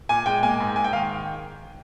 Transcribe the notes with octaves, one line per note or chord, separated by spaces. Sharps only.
A#2 G#5
G#3 G5
A#3 G#5
G#2
G#2 G#5
G5
D#3 F5